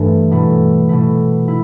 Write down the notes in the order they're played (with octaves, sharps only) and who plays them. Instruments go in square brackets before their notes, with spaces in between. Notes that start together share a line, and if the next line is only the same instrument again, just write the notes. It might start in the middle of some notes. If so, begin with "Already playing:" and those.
Already playing: [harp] G2 E3 A3
B2 A3 E4
B2 A3 E4
E4